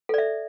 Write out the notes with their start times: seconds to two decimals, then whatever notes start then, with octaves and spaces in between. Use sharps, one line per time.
0.09 A4
0.14 D5
0.18 E5